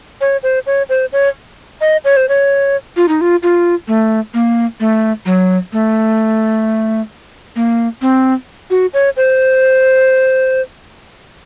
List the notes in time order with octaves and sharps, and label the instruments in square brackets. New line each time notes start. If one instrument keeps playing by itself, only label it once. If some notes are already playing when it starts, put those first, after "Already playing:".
[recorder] C#5
C5
C#5
C5
C#5
D#5
C#5
C5
C#5
F4
D#4
F4
F4
A3
A#3
A3
F#3
A3
A#3
C4
F#4
C#5
C5